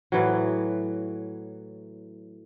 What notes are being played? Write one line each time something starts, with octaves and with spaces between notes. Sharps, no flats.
A2 E3 F#3